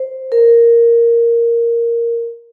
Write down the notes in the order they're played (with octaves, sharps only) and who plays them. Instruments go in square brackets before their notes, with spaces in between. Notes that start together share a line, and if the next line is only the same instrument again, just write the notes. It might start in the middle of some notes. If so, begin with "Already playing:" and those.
Already playing: [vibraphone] C5
A#4